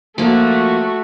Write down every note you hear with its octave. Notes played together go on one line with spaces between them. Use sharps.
F3 A3 A#3 F#4